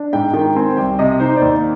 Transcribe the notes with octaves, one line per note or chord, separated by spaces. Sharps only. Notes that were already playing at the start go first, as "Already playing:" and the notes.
Already playing: D4
G#2 G5
D#3 G5
C4 G#5
C2 G5
C3 D#5
D#4 C5
D5
D#2